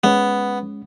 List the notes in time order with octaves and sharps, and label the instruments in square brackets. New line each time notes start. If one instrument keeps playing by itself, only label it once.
[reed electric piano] G#3 C#4 [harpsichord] B3